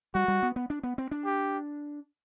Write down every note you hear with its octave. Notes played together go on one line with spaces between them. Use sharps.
G3 F#4
G3
B3
B3
D4
B3
C4
D4
G4